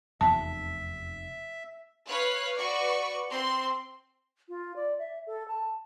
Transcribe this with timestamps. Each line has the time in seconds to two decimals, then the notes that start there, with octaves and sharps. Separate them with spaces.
0.21 F1 E2 A#3 E5 A5
2.07 B4 C#5 F5 F#6
2.55 F#4 B4 D5 C#6
3.29 C4 C6
4.49 F4
4.76 D5
4.99 E5
5.27 A4
5.48 A5